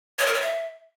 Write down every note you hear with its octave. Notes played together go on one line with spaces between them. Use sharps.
C#5
A#4
C#5
E5